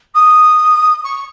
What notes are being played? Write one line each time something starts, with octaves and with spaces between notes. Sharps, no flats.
D#6
C#6